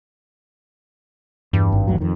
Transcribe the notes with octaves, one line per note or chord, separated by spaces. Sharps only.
E2 G2
G#1
D#1 A1 F#3
F2 D#3